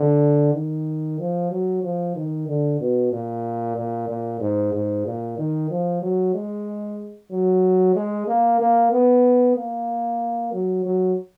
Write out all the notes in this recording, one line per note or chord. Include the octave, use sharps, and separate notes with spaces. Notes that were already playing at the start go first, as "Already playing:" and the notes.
Already playing: D3
D#3
F3
F#3
F3
D#3
D3
B2
A#2
A#2
A#2
G#2
G#2
A#2
D#3
F3
F#3
G#3
F#3
G#3
A#3
A#3
B3
A#3
F#3
F#3